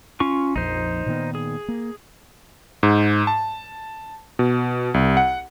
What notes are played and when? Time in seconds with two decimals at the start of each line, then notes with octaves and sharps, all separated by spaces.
0.20 C#4 F4 C#6
0.56 A#1 F2 D#4 C5
1.06 A#2 D#3 B3
1.35 G#4
1.68 A#3
2.83 G#2
3.27 A5
4.39 B2
4.94 C2
5.17 F#5